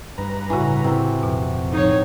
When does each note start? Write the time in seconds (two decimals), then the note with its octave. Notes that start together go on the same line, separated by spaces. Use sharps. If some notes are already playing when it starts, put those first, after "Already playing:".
0.18 G2 B4 A#5
0.50 A2 C#3 E3 F#4
0.84 A2 C3 E4
1.23 F2 B2
1.72 A2 F3 D#4 C#5